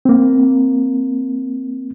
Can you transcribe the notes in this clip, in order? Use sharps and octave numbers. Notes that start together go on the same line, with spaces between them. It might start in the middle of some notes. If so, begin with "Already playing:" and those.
A#3 C4